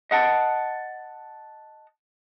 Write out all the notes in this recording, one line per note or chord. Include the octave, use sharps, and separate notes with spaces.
D#5 F#5 A5